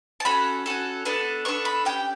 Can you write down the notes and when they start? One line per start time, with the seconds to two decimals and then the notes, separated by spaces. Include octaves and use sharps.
0.20 A5
0.25 C#4 F#4 A4 B5
0.66 C#4 F#4 A4
1.05 B3 D4 A4
1.45 B3 D4 A4 C#6
1.65 B5
1.85 C#4 G4 G5